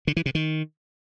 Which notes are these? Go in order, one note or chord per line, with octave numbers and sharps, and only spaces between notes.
D3
E3
C3
D#3